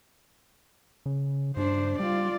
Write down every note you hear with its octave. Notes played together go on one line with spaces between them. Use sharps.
C#3
G2 D4 C5
G3 F4 D5